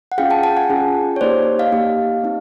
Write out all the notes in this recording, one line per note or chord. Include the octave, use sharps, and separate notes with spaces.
F#5
C#4 F4 G#4 F5 G5
G5 A5
G5 A5
F#5 G#5
C#4 F4 G#4
C#5
A#3 D#4 G4 C5 D5
D#5 F5
A#3 D#4 G4
C4 D#4